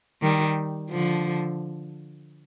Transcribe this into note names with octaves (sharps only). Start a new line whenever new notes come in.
D#3 G3
D3 F3